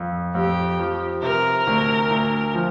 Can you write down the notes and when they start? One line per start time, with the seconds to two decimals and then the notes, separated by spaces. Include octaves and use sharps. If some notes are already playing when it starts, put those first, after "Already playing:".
Already playing: F2
0.35 F2 G4
0.79 F3
1.23 C3 A#4
1.67 D2
2.10 D2
2.55 F3